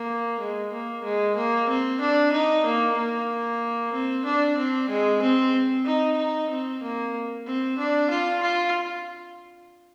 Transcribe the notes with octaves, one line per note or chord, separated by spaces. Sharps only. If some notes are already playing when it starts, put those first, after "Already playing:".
Already playing: A#3
G#3
A#3
G#3
A#3
C4
D4
D#4
A#3
A#3
C4
D4
C4
G#3
C4
D#4
D#4
C4
A#3
C4
D4
F4
F4